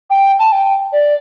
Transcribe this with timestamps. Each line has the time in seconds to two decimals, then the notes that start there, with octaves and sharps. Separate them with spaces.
0.10 G5
0.39 A5
0.52 G5
0.93 D5